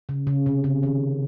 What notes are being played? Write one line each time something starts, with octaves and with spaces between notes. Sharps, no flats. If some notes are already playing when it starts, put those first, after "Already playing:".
C#3
C#3
C3
C#3
D#3